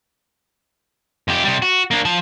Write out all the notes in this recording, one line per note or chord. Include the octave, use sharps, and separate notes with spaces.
F2 G4
C3 G3
F#4
A#3 D4
F3 A5